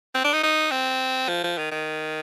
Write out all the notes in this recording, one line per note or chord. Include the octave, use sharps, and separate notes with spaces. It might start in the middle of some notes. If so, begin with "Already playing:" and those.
C4
D4
D#4
D#4
C4
F3
F3
D#3
D#3